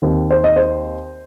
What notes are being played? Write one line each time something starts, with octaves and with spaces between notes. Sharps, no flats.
D#2 D#3 C4
C5
D#5
C5